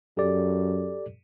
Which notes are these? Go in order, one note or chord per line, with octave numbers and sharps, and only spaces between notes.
F#2 G4 A4 D5